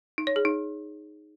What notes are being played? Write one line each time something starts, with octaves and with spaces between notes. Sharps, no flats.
D#4
C#5
G#4
D#4